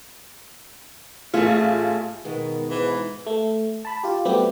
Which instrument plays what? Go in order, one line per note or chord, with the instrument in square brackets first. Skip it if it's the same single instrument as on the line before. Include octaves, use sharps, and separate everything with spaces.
[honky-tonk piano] A1 F4 [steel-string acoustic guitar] A3 G#4 E5
[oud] B2 G#3 B3 [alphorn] D#3
[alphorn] G#2 [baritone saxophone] E3 [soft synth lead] B4
[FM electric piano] A3
A5 B5
F4 G4
F#3 G3 A3 B3 C4 G4